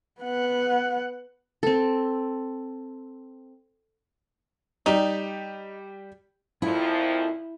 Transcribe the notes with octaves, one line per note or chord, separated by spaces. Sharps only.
B3 F#5
C4 A4
G3 D#4 G4
F2 A#2 F3 E4